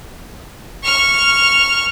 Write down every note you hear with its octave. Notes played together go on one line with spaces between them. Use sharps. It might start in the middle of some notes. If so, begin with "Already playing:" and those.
C#6 F6